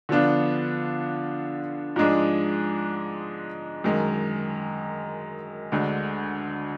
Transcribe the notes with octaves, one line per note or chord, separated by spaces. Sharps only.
D3 F3 B3 D4 F4
G#2 F3 G#3 D4 G#4
F#2 D#3 G#3
D2 D3 G#3